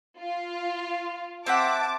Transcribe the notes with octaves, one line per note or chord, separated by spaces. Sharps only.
F4
C4 E5 F#5 A5 D6